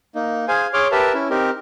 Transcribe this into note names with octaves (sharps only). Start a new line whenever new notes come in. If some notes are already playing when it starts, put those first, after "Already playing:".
A#3 D#4
G#4 C5 F5 G#5
G#4 C#5 C6 D6 F6
G4 A#4 B4 E5 A5
C#4 E4
C4 D#4 G4 A#4